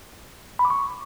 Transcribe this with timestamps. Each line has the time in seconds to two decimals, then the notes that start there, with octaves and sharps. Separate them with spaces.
0.59 B5
0.65 D6
0.70 C#6